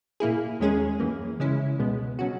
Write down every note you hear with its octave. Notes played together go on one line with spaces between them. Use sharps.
A#2 A#3 E4 G#4
D#2 D#3 G#3 C#4 G#4
F#2 E3 A#3
C#3 G#3 C#4 E4
C#2 B2 G#3 B3
B2 F#3 C#4 F#4